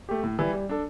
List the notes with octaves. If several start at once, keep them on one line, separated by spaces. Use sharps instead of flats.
A3 G4
A2
E3 G3 E4
G3
D4 A4